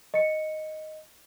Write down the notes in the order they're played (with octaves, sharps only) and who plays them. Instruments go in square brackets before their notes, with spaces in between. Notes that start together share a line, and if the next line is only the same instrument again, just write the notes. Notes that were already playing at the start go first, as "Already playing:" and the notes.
[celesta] D#5 C#7